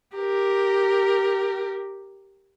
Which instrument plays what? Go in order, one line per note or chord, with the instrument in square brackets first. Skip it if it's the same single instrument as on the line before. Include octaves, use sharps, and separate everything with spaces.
[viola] G4 A#4